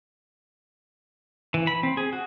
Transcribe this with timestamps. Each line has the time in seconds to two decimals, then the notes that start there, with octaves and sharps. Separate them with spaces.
1.54 E3
1.67 B5
1.83 C4
1.97 G#4
2.13 F#4